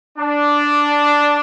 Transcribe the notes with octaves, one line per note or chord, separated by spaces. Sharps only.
D4